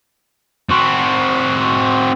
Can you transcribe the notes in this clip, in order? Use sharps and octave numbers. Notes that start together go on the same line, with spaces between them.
C4 F#4